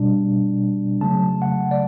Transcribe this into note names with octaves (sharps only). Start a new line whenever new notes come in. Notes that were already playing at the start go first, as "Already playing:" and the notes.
Already playing: B2 G3 D4
C#3 F#3 A3 A5
F#5
D5